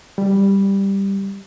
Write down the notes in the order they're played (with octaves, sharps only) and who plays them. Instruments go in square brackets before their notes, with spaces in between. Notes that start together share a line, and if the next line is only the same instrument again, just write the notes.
[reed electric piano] G3